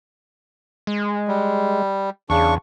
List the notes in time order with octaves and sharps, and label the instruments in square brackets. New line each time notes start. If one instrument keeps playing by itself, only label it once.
[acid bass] G#3
[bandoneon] G3
[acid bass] E2 [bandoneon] C#3 D4 C#6